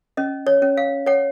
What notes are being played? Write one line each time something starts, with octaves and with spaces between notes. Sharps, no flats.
C#4 D#5
C#5
C#4
F5
C#5 F#5